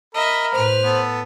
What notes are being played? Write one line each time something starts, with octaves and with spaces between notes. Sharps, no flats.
A#4 D#5 E5 B5
A2 B4 C5 F6
B3 A4